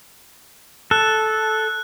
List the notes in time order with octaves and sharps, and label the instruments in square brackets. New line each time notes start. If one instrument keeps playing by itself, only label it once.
[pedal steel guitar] A4 [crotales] F#6